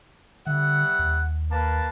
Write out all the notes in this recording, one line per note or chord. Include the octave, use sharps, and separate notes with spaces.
D3 G3 E5 F#5
D#2
A#3 B4 A5